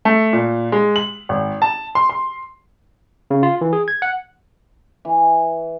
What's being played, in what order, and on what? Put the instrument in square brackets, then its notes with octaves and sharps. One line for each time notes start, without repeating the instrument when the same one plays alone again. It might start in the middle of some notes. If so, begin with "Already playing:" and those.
[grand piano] A3
A#2
G#3
F#7
G#1
A5
C6
C6
[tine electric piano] C#3
F4
E3
G#4
G#6
F#5
[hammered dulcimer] E3